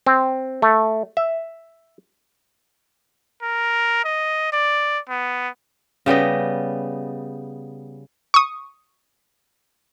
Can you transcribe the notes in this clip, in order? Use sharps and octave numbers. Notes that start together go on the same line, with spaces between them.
C4
A3
E5
A#4
D#5
D5
B3
C#3 G3 B3 D#5
C#6 D#6